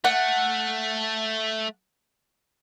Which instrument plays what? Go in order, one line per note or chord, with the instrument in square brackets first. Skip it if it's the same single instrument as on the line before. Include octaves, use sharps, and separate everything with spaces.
[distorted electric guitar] A3 [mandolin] F#5